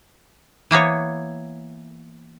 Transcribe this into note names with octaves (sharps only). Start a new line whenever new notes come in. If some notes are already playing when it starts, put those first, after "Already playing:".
E3 A#3 B3 C#5